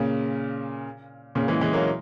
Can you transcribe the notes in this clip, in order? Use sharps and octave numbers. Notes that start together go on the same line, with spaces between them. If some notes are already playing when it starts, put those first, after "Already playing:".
Already playing: A#2 C#3
A#2 C#3
E3 G#3
E3 G#3
F#3 A#3